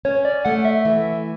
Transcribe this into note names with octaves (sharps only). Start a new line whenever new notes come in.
C#4 C#5
D5
A3 F#5
E5
E3